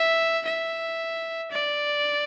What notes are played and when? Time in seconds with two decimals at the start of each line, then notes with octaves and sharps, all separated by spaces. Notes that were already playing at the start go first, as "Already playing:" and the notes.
Already playing: E5
0.46 E5
1.52 D5